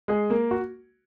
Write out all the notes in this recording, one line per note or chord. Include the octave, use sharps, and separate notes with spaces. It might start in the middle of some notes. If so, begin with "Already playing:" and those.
G#3 G#4
A#3 A#4
F#4